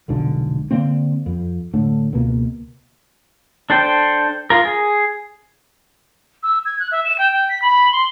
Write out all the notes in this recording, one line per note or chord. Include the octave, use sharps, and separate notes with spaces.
F1 B1 G#2 D3
D3 A#3 C4
F2
A2 D3 A3
C#2 B2 A#3
D4 A4 C5 G5
F4 A#4
G#4
E6
G#6
F#6
E5
E7
G5
G5
B6
B5
C6